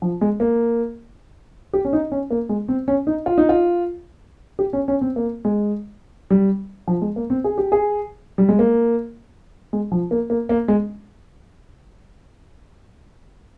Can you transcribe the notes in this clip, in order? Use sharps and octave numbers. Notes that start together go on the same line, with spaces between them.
F3
G#3
A#3
G4
C#4
D#4
C#4
A#3
G#3
C4
C#4
D#4
F4
D#4
F4
G4
C#4
C#4
C4
A#3
G#3
G3
F3
G#3
A#3
C4
G#4
G4
G#4
G3
G#3
A#3
G#3
F3
A#3
A#3
A#3
G#3